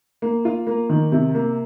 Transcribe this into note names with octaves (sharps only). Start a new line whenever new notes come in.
A#3
F4
A#3
D#3
C3
A#3